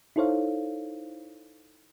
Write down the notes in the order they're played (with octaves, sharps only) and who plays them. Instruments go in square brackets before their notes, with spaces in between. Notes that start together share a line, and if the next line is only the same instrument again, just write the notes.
[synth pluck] D#4 E4 A4 C5 C#5 F5